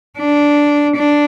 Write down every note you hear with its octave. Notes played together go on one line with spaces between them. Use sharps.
D4
D4